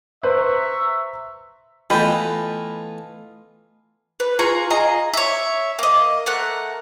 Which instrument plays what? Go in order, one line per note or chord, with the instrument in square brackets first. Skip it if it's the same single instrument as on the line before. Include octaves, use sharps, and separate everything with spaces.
[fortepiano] B4 C5 [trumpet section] E5 A#5 C#6
[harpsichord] E3 A3 B3 [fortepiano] F4 D#5 B5 [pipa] B4 G5
[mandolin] B4
F4 G#4 A#5 C#6
F4 G#4 D#5 A#5
C#5 E5
A#3 D#5
A3 A#4 F#5 F#6